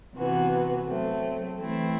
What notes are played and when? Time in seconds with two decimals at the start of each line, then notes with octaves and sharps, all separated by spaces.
0.15 C3 E3 B3 F#4
0.87 F#3 A3 C4
1.59 E3 A3 C4 E4